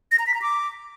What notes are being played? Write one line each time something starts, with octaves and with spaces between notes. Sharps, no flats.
A#6
A#5
B6
A#5
D6